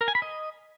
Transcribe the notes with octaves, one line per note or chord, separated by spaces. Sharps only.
A#4
G#5
B5
D#5